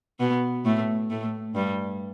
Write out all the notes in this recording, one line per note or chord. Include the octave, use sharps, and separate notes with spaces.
B2 B3
A2 A3
A2 A3
G2 G3